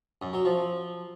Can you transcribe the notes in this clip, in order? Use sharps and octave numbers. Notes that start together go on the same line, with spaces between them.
F#2
F#3
F3